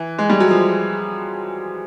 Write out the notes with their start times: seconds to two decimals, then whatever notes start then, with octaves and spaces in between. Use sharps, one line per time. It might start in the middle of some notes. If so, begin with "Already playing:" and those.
Already playing: E3
0.18 G#3
0.30 G3
0.40 F#3
0.51 F3